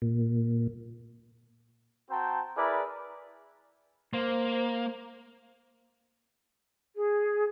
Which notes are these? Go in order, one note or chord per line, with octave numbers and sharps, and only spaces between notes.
A#2
C4 F#4 C5 G5 A5 A#5
E4 G#4 A#4 B4 D5
A#3 C5
G#4